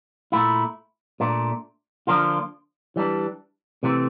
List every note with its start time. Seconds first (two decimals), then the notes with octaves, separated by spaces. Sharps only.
0.32 A#2 A3 E4
1.20 A#2 A3 D4
2.07 D3 F3 A#3 D4 F4
2.96 E3 G3 D4
3.83 C3 E3 A3 C4